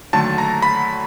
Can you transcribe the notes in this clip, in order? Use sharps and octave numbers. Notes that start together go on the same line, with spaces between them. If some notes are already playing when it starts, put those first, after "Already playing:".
D#2 D3 F#3 A3 A5
A#5
B5